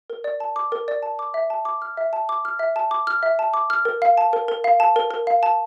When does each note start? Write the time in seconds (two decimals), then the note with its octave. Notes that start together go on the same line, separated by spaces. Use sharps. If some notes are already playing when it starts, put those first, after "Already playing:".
0.10 A#4
0.24 D5
0.40 A5
0.56 D6
0.72 A#4
0.88 D5
1.03 A5
1.19 D6
1.34 E5
1.50 A5
1.65 D6
1.82 F6
1.97 E5
2.13 A5
2.29 D6
2.45 F6
2.59 E5
2.76 A5
2.91 D6
3.07 F6
3.23 E5
3.39 A5
3.54 D6
3.70 F6
3.85 A#4
4.02 F5
4.18 A5
4.33 A#4
4.48 A#4
4.64 F5
4.80 A5
4.96 A#4
5.11 A#4
5.27 F5
5.43 A5